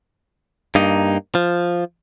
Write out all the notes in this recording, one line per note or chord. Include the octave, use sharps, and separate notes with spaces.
G2 A#3 D#4
F3